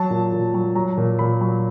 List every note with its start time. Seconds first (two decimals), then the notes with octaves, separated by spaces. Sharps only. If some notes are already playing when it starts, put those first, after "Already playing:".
Already playing: F#3 A5
0.10 A#2
0.32 A#2
0.54 F#3
0.75 F#3 A#5
0.97 A#2
1.19 A#2 B5
1.41 F#3